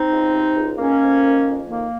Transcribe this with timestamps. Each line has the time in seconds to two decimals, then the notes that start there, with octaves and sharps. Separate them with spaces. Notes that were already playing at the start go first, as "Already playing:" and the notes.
Already playing: C4 D#4
0.12 C#2
0.33 C3
0.56 C#2
0.79 D#3 A#3 C#4
1.01 F2
1.24 D#3
1.46 F2
1.68 D#3 A#3